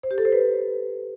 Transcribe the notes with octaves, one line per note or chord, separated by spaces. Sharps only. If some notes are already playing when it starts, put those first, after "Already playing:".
C5
G4
A4
C5
B4